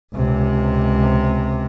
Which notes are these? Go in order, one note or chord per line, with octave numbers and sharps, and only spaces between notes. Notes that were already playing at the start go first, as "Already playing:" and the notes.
C#2 C3